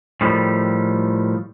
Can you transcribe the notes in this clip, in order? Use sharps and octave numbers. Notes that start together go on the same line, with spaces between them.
A2 D#3 F3 G3